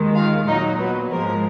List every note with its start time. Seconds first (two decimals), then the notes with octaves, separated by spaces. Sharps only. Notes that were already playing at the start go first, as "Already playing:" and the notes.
Already playing: D#2 D#3 G#3
0.14 F4 F5
0.46 A#2 F#3 D#4 D#5
0.78 B3 B4
1.11 G#2 F3 G#3 A#3 A#4